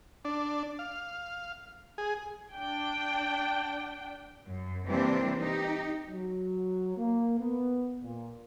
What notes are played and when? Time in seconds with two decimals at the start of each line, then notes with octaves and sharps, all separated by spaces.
0.25 D4
0.79 F5
1.98 G#4
2.54 D4 G5
4.46 F#2
4.86 C3 E3 G3 A#3 C4 D4
5.39 D#4 G4
6.10 F#3
6.97 A#3
7.39 B3
8.02 A#2